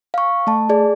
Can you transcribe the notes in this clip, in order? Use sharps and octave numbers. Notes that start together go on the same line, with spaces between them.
F5 C#6
A3 A5
G#4 D5